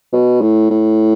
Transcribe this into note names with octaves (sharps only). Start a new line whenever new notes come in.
B2
A2
A2